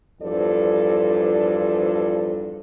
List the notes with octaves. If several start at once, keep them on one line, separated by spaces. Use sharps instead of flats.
E2 G2 F3 A4 C5 D5